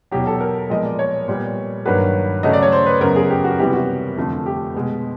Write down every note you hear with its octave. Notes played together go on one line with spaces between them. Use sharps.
E2 B2 F#3 G4
A4
A#4
A#2 F3 G#3 B3 D#5
D5
C#5
A#2 G3 B3
G2 D#3 F#3 A#3 B4
C#3 F#3 A3 D#5
D5
C#5
C5
B4
F#2 C#3 F#3 B3 A#4
G#4
G4
F#4
C3 E3 G3 B3 G4
F#4
F2 D3 F3 A3
G4
B2 G#3 B3